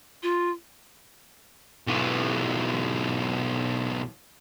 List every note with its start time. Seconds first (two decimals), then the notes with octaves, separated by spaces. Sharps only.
0.23 F4
1.87 B1 E3